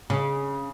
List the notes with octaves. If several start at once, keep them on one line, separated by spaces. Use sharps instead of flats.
C#3